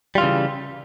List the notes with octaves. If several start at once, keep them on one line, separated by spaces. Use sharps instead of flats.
C#3 E3 G3 F4